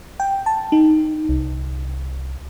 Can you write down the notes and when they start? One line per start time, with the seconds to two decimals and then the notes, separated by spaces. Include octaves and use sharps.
0.20 G5
0.46 A5
0.72 D#4
1.29 C2